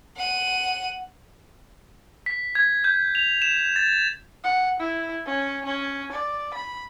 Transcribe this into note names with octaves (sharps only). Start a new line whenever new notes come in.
F#5 D#7
B6
G#6
G6
F7
E7
A6
F#5
E4
C#4
C#4
D5
B5